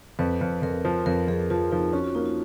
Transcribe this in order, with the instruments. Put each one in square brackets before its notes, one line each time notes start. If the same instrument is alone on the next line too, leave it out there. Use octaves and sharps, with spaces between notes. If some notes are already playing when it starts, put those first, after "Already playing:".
[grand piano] F2 [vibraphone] B4
[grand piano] F2
[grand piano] F2 [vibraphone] A#4
[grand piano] F3
[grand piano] F2 [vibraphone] A#4
[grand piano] F2 [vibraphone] G#4
[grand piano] F3 [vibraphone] F4
[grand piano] F3 [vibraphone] D#4
[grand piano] C#4 [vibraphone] F#4
[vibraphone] F4
[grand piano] A#3 [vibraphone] D#4
[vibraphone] F4